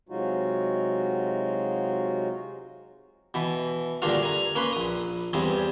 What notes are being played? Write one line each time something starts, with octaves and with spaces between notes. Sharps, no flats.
C3 F#3 G#3 D#4 F4 F#4
B2 E3
D2 G2 A#2 D4 F4 F5
G#5 A#5
A#3 C#4 B4 C6
A#1 D#6
E2 G2 G3 C4 G#4